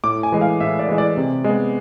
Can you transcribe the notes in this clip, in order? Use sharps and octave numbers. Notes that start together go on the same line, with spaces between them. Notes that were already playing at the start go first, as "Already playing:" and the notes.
A2 D6
G#5
E3 G#3
F5
A2 E5
D5
E3 G#3
D5
C3
G#3 B3